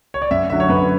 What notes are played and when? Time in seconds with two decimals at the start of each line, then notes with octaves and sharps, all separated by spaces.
0.14 C#5
0.22 D5
0.31 F#2 E5
0.50 D3 F#3 E5
0.60 C#5
0.69 F#2 B4